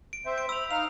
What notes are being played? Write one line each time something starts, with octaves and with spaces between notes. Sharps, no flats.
D7
C4 C5 E5
D7
B5 E6 F7
D#4 F5 F6 F7